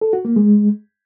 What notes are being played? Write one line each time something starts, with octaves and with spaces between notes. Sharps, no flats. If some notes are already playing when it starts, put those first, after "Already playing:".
A4
F#4
A#3
G#3